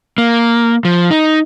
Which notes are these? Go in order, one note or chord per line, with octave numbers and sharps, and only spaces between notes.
A#3
F3
D#4